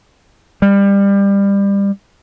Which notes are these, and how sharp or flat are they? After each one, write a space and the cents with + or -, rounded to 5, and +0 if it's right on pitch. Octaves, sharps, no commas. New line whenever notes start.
G3 +25